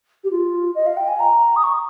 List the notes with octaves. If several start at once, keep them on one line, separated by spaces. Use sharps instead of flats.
G4
F4
D#5
F5
G5
G#5
A#5
D#6
C#6